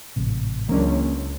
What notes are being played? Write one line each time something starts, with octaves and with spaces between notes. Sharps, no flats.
A1 G#2 C3
C#2 E3 F#3 A#3 C#4 D4